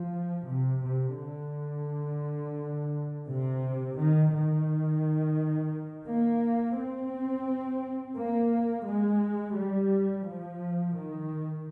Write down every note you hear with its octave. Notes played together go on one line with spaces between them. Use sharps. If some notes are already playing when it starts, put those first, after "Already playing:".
Already playing: F3
C3
C3
D3
C3
D#3
D#3
A#3
C4
A#3
G#3
G3
F3
D#3